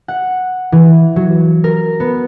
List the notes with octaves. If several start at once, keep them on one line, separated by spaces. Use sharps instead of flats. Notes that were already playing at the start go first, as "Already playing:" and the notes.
F#5
E3
F#3
A#4
B3